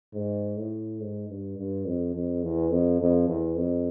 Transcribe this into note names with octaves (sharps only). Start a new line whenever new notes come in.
G#2
A2
G#2
G2
G2
F2
F2
E2
F2
F2
E2
F2